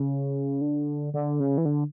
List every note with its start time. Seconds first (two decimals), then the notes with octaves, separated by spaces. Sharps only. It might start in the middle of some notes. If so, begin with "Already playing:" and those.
Already playing: C#3
0.61 D3
1.14 D3
1.40 C#3
1.58 E3
1.65 D3